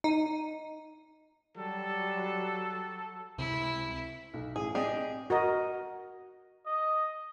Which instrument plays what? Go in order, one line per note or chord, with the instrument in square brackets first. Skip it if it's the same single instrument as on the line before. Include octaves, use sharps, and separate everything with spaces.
[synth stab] D#4
[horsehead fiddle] F#3 [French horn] G3 [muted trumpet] A4
[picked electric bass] C#2 C3 C4 [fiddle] E4
[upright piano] B1
[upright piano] A1 [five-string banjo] G#4
[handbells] C4 D5 C7 [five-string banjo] G4 G#4 [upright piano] D#5
[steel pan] F#4 A#4 D#5
[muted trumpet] D#5